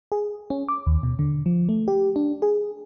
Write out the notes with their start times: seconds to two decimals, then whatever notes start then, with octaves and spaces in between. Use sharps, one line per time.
0.12 G#4
0.50 C#4
0.68 D6
0.86 D#2
1.03 B2
1.19 D3
1.46 F3
1.69 A3
1.88 G4
2.16 D4
2.42 G#4